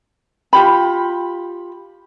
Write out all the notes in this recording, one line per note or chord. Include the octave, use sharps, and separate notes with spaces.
F4 G4 B5